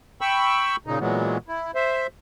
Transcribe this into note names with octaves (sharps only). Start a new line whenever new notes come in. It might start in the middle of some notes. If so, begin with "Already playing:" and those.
G5 B5 C#6 E6
A#2 C#3 D#4
A#2 E3 F#3 G#3 B3
E4
C5 E5